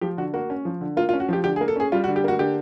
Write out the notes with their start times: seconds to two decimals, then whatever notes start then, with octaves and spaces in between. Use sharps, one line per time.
0.01 F3 G4
0.17 D3 F#4
0.34 A#3 F#4
0.50 C#4
0.65 F3
0.81 D3
0.97 A#3 F4
1.09 F4
1.13 C#4
1.20 F#4
1.29 F3 G4
1.44 D3 G4
1.56 G#4
1.61 A#3
1.68 A4
1.76 C#4 G#4
1.92 G3 F4
2.04 F#4
2.08 D3
2.16 G4
2.24 A#3 F#4
2.39 D3 G4